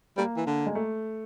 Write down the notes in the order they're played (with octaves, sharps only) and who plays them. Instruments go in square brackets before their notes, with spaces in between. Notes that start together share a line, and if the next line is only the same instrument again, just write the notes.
[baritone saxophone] G3 [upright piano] A#3
[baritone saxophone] E3
D3
[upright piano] G#3
A3